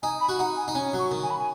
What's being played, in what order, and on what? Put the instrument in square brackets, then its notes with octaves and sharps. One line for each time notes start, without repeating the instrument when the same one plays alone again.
[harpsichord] D#4 [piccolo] G#5
[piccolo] B5
[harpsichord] F#4
[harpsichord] D#4 [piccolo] F#5
[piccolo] G#5
[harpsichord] D#4
[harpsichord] C#4 [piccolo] G#5
[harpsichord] F#3
[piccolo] C#6
[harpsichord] D#3
[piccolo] G#5
B5
G#5